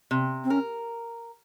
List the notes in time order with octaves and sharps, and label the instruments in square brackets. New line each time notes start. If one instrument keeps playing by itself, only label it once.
[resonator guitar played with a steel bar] C3
[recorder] C4
[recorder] C#4 [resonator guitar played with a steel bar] A#4